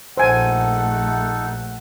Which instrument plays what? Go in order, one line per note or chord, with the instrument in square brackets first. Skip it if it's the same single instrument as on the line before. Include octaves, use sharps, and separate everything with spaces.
[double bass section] A#1 A3 [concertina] D#4 A4 [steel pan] C5 G#5 [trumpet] F#5